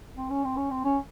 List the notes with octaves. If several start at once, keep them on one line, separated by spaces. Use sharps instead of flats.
C4
C#4
C4
C#4
C4
C#4